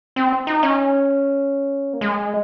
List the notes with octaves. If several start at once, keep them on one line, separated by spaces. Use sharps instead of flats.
C4
D#4
C#4
A#3
G#3